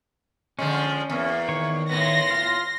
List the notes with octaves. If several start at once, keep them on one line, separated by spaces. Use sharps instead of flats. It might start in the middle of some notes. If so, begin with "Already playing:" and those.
D3 F3 G#3 C#4
E2 A#3
D#3 C#5
A2 B3 C6 A#6
F4